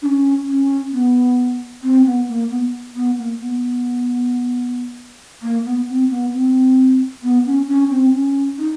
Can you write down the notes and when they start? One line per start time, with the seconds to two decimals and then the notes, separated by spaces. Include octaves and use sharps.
0.02 D4
0.06 C#4
0.47 C#4
0.92 B3
1.83 C4
2.05 B3
2.28 A#3
2.50 B3
2.95 B3
3.17 A#3
3.40 B3
5.42 A#3
5.65 B3
5.89 C4
6.10 B3
6.33 C4
7.23 B3
7.46 C#4
7.68 C#4
7.90 C4
8.13 C#4
8.58 D#4